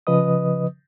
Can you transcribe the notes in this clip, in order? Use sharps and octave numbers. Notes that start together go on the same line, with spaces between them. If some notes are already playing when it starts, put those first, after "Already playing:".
C#3 F3 B4 D#5 D#6